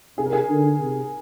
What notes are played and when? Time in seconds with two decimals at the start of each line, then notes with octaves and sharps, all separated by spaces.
0.18 C3 G#4
0.26 A#4
0.33 G#4
0.49 D3
0.80 C3